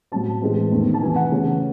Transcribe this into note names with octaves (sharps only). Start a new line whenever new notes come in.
A2 F#3 C4 A5
A2 E3 G#3 C4
E2 D#3 A3 C4
A5
C3 E3 C4 G#5
F#5
C#3 E3 A3 C#4